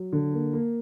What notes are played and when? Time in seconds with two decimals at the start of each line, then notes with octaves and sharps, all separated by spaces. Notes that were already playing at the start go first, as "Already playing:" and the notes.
Already playing: F#3
0.13 D3
0.33 A#3
0.53 A#3